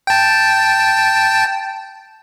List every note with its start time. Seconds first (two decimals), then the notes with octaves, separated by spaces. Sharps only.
0.07 G5 A5